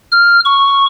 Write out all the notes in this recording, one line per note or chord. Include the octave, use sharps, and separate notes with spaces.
F6
C#6